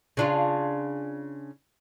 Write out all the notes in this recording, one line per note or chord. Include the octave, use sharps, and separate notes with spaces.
C#3 D4 F4